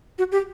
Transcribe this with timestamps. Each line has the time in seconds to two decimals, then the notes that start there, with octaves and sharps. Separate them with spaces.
0.19 F#4
0.32 G4